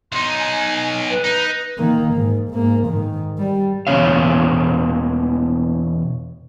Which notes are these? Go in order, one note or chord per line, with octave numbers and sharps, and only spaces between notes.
B1 D#4 C6
G#5
B4
D#4
D#3 A#3
G#2
G#2 A#3
G#2 D#3
G3
E2 B2 C#4 C#5 F5